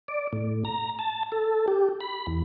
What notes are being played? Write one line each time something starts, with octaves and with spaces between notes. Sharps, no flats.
D5
A2
A#5
A5
A4
G4
B5
E2